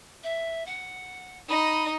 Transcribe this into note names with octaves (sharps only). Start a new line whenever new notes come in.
E5
F#5
D#4 D#5 B5